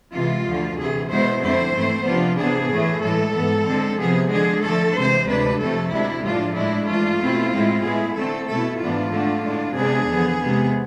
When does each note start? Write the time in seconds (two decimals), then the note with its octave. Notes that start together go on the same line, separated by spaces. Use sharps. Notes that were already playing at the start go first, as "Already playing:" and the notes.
0.13 C3 E3 G#3 F4
0.45 D2 D3 F3
0.77 D2 C3 E3 G#4
1.10 B2 G#3 B3 E4 C5
1.41 F2 D3 A3 C4 E4 C5
1.73 G#2 E3 A3 C4 E4
2.05 C3 F3 B3 D4 F4
2.37 C3 E3 B3 D4 G#4
2.69 A2 E3 A3
3.01 A2 E3 G#3 A4
3.34 G#2 E3 B3
3.66 D3 G#3 C4
3.98 C3 F3 B3 G#4
4.30 D3 F3 G#3 D4 G#4
4.62 D3 F3 A3 A4
4.95 C3 E3 G#3 C4 C5
5.26 D2 C3 G#3 D4 B4
5.59 F2 C3 F3 A3 A4
5.90 D2 C3 G#3 D4 E4
6.23 A2 F3 G#3 D4 F4
6.54 A2 G#3 D4 E4
6.87 G#2 E3 A3 D4 F4
7.19 B2 A3 C4 E4
7.51 A2 G#3 C4 E4
7.83 A2 G#3 B3 E4 G#4
8.15 D3 A3 C4 A4
8.47 B2 A3 E4 A4
8.79 G#2 E3 B3 D4 F4
9.12 D3 A3 D4
9.43 A2 G#3 D4
9.75 C3 G#3 B3 D4 G#4
10.08 E2 D3 F3 B3
10.40 C3 G#3 B3